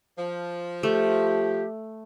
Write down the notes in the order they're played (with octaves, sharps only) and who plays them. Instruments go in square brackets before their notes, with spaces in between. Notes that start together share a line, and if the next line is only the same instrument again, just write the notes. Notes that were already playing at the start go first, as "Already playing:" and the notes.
[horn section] F3
[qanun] A3 [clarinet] G4